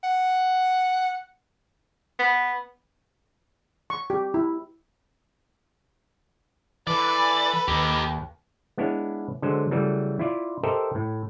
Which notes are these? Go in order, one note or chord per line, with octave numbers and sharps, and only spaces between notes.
F#5
B3
C#6
G4
E4
E3 A4 B4 D5
D#2 D#4 G4
G#3 B3 D4 E4 C#5 F5
D3 F#3 G#3 A4 C5
C#3 E3 F#3 G3 A3
E4 F4 D5
G4 A4 A#4 C5 D#5 E5
A2